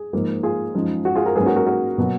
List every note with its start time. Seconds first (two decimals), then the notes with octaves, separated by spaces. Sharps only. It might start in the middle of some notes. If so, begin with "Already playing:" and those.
Already playing: G#4
0.13 G#2 F3 A#3
0.43 F4 G#4
0.74 F#2 F3 G#3 D#4
1.05 F#4
1.15 F4 G#4
1.26 F#4 A#4
1.36 G#2 F#3 A#3 C#4 G#4 B4
1.46 F#4 A#4
1.56 F#4 A#4
1.66 F#4 A#4
1.98 B2 F#3 A#3